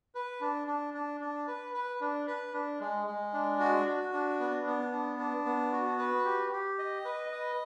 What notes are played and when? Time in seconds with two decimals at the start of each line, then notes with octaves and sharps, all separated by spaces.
0.15 B4
0.41 D4
0.68 D4
0.94 D4
1.21 D4
1.47 B4
1.74 B4
2.01 D4
2.27 B4
2.53 D4
2.80 G#3
3.07 G#3
3.33 D4
3.60 F#4
3.87 F#4
4.13 D4
4.39 B3
4.67 B3
4.92 D4
5.19 D4
5.45 B3
5.72 F#4
5.99 B4
6.25 G4
6.52 G4
6.79 D#5
7.05 B4
7.32 D#5